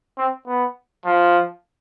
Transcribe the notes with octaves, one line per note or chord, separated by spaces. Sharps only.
C4
B3
F3